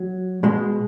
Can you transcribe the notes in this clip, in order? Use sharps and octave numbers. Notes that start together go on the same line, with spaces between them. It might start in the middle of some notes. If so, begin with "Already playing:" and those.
Already playing: F#3
B2 G#3